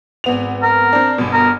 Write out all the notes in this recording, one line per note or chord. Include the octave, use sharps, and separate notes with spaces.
G#1 B3 F7
A#4
C4 D4
G1 B2
A#4